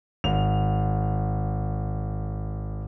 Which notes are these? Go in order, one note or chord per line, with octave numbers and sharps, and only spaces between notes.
G#1 F7